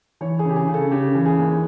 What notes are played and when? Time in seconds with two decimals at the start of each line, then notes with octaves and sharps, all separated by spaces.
0.21 E3 C#5
0.39 G#4
0.44 C#3 G4
0.56 G#4
0.67 C#3
0.74 A4
0.91 C#3 G4
1.15 E3
1.26 G#4
1.38 D#2